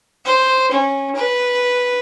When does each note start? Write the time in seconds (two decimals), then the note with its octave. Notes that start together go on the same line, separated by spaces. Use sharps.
0.25 C5
0.71 C#4
1.15 B4